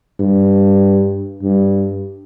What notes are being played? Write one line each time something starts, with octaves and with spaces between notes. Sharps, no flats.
G2
G2